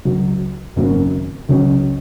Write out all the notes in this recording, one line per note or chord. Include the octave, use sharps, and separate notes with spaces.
C#2 C#3 F#3
G#1 F#2 C#3 F#3 A#3
C#2 C#3 F#3 C#4